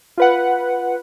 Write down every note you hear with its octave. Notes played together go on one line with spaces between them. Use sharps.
F4 B4 F#5